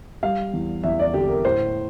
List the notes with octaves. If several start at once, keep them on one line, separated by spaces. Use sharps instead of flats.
G3 F5
E2
E2 E5
D5
D3 G4
A#4
A2 C5